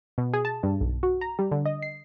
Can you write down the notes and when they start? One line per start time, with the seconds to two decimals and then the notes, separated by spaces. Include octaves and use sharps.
0.18 B2
0.34 G#4
0.45 A5
0.63 G2
0.81 B1
1.03 F#4
1.21 A#5
1.39 G3
1.51 D3
1.66 D#5
1.82 C7